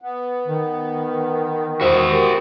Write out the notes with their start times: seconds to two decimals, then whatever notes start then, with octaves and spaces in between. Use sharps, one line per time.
0.01 B3
0.48 D#3
1.81 F#4 C5 E5 D#6
2.10 G4 A#4 G5